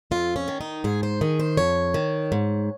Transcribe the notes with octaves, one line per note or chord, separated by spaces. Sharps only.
F2 F4
C#4
D#3
D#4
G#2 G#4
C5
D#3 G#4
C5
F2 C#5
D#3
G#2